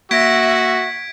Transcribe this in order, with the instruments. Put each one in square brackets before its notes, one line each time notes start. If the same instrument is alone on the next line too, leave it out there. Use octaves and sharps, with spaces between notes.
[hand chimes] A#3 A#6 [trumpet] F#4 [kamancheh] E5 [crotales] G#6 B6 D7